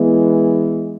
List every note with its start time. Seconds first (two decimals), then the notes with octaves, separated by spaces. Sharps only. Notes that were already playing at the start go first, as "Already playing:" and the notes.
Already playing: E3 G#3 B3